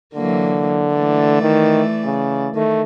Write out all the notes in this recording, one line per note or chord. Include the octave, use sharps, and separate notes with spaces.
D3 E3 F#3 A#3
E3 A3 D5
D#3
C#3
D#3 A3